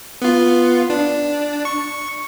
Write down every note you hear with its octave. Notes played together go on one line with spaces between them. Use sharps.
B3 F4
D4
C#6